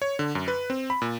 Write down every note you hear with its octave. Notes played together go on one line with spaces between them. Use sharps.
C#5
D3
F#2
B4
C4
B5
A#2